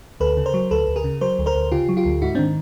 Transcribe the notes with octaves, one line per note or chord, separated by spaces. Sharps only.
D2 A4 B4
C#3
A#4 C5
F#3
D2 A4 B4
D2
G#4 A#4
C#3
F#3 A#4 C5
D2
A#4 C5
D2
C#3 F4 G4
F#3
F4 G4
D2
G#2 E4 F#4
C4 D4
D#3